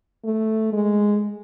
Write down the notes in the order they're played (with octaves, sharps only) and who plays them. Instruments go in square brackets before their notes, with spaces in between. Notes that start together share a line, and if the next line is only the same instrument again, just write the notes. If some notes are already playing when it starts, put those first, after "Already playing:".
[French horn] A3
G#3